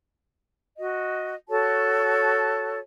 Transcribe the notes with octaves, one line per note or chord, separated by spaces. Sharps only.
F#4 D#5
F#4 A4 C#5 A5